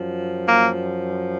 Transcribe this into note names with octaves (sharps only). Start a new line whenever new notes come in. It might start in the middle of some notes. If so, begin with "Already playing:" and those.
Already playing: F#2 F3
A#3